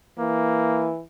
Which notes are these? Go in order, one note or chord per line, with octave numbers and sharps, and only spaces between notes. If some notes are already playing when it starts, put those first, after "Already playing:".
E3 A#3